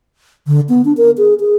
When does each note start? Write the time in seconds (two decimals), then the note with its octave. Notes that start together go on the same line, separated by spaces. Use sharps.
0.47 D3
0.69 B3
0.85 D4
0.97 A#4
1.18 G#4
1.40 G#4